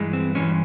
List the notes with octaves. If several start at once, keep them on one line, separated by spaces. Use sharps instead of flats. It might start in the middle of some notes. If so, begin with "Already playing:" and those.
Already playing: G2 E3 G#3
C4
G2 E3 G#3 C#4